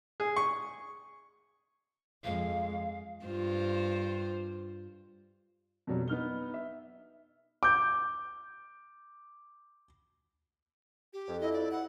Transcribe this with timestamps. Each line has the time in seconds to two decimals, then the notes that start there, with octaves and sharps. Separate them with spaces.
0.20 G#4
0.36 C#6
2.24 F2 G#3 F5
3.25 G2 F4 C5
5.87 F2 B2 F#3 G3
6.08 B3 D#4 F6 G7
6.54 E5
7.63 D6 G6
11.13 G4
11.28 F2
11.41 E4 D#5
11.53 D5
11.71 F#5